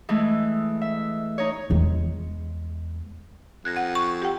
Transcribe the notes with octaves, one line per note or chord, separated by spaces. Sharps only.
E3 G#3 A3
E5
D#4 C#5
E2 G#3
F2 F#6 G#6 A#6
F#5
C#6
G4 F#5 G5